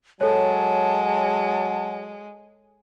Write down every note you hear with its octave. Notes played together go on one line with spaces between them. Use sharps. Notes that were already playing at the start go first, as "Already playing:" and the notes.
F#3 G#3 A4 C#5 A5